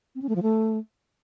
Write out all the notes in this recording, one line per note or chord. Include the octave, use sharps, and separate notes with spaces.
C4
C#4
A3
F3
A3